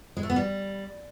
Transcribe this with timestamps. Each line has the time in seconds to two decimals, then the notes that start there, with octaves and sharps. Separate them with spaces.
0.17 G#3
0.23 A3
0.30 B3
0.36 G3